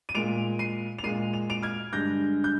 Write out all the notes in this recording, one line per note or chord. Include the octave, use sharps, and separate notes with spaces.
D#7
A#2 G#3 D7 F7
C7 D#7
F7
A#2 G#3 C7 D#7
F7
D7 F7
F6 G#6
G2 D3 G#3 G6 A#6
G6